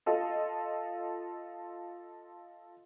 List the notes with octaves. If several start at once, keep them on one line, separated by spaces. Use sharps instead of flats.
F4 A4 D#5